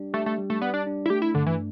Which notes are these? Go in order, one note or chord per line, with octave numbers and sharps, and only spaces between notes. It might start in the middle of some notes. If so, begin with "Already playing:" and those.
Already playing: G3 D4 G4 D5
A3 G4
A3
G3
A3
B3 D5
D4
D4
E4
A3 G4
E4
G2 D3
E3